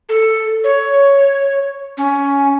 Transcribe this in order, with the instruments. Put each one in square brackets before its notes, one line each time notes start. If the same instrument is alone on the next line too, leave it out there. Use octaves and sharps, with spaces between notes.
[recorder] A4
C#5
C#4